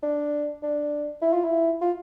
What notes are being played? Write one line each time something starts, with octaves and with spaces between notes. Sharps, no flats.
D4
D4
E4
F4
E4
F4